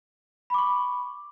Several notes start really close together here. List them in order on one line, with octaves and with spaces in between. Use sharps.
B5 D6 C#6